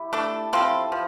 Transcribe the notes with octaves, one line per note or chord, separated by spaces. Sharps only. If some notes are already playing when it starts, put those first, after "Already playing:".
Already playing: E4 G4
A3 D4 A4
F3 C4 E4 F4 A4
F3